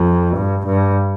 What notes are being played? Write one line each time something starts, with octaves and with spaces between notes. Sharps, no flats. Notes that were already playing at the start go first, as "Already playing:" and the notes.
Already playing: F2
G2
G2